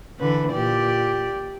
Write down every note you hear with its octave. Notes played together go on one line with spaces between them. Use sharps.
D3 E3 B4
A#2 G4 D5